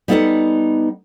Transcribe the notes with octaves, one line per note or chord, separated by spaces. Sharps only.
G3 B3 D#4 A4 B4 F#5